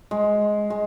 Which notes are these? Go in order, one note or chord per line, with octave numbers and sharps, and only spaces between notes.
G#3
G#3